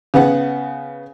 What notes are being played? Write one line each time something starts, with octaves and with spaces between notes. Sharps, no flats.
C#3 B3 F#5